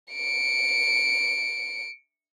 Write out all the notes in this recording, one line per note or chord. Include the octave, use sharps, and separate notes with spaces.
C#7 D7